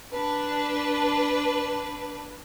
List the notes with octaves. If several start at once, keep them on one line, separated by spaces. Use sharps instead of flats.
D4 B4